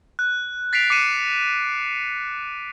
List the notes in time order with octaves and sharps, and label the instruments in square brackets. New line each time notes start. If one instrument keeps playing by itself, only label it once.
[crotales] F#6
A6 B6 C7 D7 F7
D6 C7 C#7 D#7 E7